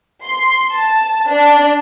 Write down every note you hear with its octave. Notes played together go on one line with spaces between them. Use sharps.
C6
A5
D4